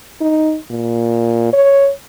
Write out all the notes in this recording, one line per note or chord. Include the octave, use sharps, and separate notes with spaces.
D#4
A#2
C#5